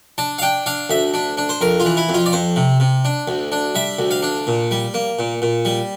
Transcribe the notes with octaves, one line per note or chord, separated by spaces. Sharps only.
D4 A5
F5
D4 G5
D4 F5
D2 E5
D4
D4
C5
F2 A#4
F4
E3
E4
F2
F4
D5
F2 C5
C3
C3
D4
D2
D4
G3 E5
D2
F5
D4
A#2
G3
A#3
A#2
A#2
G3